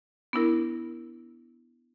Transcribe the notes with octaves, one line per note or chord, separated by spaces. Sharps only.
B3 D4 E4 A#4